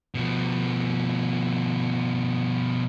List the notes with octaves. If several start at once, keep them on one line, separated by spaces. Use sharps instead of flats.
B2 F3